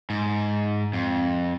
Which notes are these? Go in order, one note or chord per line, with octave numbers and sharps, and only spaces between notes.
G#2
F2